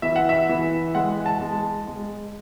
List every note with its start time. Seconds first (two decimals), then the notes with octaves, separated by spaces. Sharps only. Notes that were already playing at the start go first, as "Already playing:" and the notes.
0.02 E3 E5
0.16 F#5
0.29 E5
0.49 E3
0.95 G#3 F#5
1.26 A5
1.41 G#3
1.87 G#3